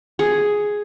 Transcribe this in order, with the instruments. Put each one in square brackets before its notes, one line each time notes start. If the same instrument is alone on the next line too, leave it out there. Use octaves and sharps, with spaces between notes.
[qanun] G#4